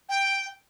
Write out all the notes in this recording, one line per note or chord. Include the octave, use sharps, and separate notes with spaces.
G5